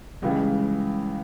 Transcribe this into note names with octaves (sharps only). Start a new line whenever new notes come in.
C#2 C#3 E3 G3
G#3
G3